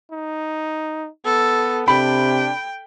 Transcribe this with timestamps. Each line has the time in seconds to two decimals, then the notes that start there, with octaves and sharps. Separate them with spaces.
0.12 D#4
1.25 B3 A4
1.88 C3 D4 G5 B5